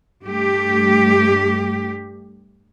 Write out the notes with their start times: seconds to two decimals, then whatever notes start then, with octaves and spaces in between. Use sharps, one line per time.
0.22 G2 A3 G4